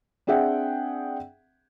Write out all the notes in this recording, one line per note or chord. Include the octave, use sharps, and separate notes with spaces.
C4 D4 G#4 E5 F#5 G5